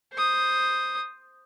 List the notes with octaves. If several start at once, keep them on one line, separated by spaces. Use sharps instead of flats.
C5 D#6